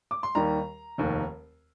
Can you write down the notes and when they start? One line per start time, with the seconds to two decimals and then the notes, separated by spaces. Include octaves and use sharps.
0.11 D6
0.23 C6
0.35 D#2 D#3 G3 A#5
0.98 F1 D#2 D#3